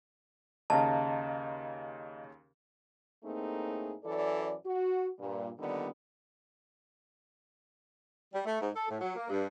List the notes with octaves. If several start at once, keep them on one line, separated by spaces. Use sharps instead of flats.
D#2 C#3 D#5 F5 A5 A#5
A2 A3 A#3 C4 D#4 G#4
F#2 E3 A4 D5
F#4
G2 A#2
A#2 D3 D#3 G3 B3 D#4
G3
A3
G#2
A4
A2
F#3
A#3
G2